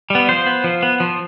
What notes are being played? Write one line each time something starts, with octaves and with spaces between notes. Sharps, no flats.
G3 B3
F3 C5
B3
F3
B3
F3